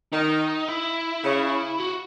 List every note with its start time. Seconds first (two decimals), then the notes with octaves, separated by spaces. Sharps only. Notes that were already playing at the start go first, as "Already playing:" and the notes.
0.12 D#3 D#4
0.68 E4
1.23 C#3
1.79 F#4